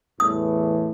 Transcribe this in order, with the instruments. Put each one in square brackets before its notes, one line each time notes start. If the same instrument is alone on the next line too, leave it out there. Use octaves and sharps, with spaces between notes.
[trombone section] E2 A2 E3 [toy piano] D#6